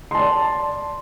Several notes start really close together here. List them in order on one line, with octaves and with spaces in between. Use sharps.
C6 A5 D5